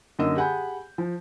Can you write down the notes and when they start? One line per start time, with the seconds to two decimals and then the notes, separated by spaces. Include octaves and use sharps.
0.19 F#2 D3 A#3 D#4 D#5 E6
0.36 G4 G#4 F#5 G#5 B5 G6
0.98 F3